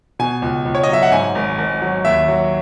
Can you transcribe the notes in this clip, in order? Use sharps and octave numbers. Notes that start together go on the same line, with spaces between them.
B2 G#5
C#2
C#2
C#5
D#5
F#3 E5
F#5
G#2 G#5
G#1
G#1
F#3
D#2 E5
F#3